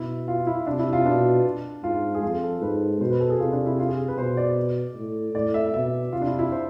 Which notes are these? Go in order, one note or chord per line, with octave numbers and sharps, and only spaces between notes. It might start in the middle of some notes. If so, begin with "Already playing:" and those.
Already playing: B2 E4
F4
E4
C3 D4
E4
F4
B2 D4
G#2 F4
G#4
F2 F4
A4
G#2 B4
B2 C5
B4
A4
G#4
C3 F4
D4
E4
F4
G#4
B4
B2 C5
D5
A2
A2 D5
E5
B2 E5
C3 F4
D4
E4
E4
C5